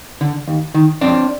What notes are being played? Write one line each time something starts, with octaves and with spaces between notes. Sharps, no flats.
D3
D#2
D#3
F2 C4 D4